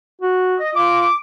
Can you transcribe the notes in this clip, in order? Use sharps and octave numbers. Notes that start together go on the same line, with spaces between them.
F#4
D#5
F4 D6